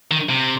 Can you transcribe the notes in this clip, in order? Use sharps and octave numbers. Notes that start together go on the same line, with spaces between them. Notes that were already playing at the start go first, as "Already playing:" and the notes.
D#3
C3